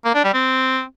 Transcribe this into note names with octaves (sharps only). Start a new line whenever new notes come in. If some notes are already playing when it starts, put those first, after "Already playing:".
A#3
D4
G3
C4